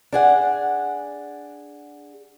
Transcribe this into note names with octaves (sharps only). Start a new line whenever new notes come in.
D4 G#4 F#5